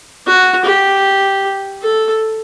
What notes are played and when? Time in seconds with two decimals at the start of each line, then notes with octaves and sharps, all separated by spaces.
0.27 F#4
0.65 G4
1.82 A4